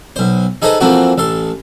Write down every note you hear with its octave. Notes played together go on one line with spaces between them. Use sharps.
B1 C5
D#4 G#4 A4 B4 C5 D#5
E3 F3 A3 A#3 C4 F#4
A1 A4 C6